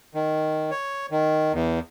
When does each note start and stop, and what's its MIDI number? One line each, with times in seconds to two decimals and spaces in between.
0.14 0.71 51
0.71 1.06 73
1.11 1.53 51
1.54 1.79 40